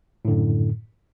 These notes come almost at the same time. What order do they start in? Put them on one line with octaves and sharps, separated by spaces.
A2 D3 F#2